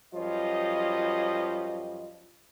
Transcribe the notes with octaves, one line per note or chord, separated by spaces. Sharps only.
F#2 F3 G3 F4 C#5 D#5